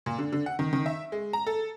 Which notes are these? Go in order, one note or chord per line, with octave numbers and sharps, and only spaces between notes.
A#2
D3
D3
F#5
D#3
D#3
E5
G#3
A#5
A4